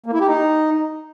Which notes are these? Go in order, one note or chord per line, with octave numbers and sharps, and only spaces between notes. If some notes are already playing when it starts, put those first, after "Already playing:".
A#3
E4
G4
D#4